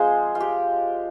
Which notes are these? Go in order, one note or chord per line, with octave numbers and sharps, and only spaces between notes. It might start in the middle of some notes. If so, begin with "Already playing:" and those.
Already playing: F3 G#3 C4 G#4 C5
F4
G4